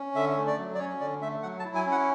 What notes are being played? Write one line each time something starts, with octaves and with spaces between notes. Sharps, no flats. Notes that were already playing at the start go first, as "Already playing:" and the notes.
Already playing: C#4
D3 E5
A3
D5
F#3
D5
C#4 C#5
D3 D5
A3 E5
F#3 F#5
A5
E4
G#5
C#4
F#5